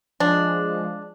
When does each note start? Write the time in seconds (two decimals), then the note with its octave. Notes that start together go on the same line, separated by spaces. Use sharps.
0.20 F3 G#3 D4